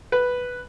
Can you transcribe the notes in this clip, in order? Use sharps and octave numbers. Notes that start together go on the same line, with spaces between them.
B4